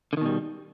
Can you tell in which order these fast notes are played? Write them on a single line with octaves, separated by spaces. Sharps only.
D3 D#3 B2 G3